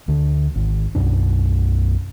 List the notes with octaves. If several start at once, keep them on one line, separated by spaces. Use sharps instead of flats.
D2 D3
G#1
B1 F#2 B2 D4